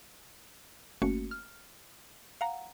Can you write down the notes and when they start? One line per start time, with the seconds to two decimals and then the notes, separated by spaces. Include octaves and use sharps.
1.02 G1 A3 A#3 C#4 F#4 C#7
1.31 F6
2.41 F5 F#5 A#5